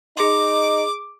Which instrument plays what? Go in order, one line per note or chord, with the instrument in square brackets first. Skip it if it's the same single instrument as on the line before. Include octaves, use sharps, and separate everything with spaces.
[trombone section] D#4 [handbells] G#4 C6 [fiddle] D6